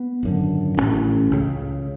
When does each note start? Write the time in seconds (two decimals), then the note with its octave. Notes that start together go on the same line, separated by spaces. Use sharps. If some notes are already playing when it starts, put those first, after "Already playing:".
Already playing: B3
0.23 G#1 F#2 D3
0.77 A1 A2 C#4
1.32 C#2 C#3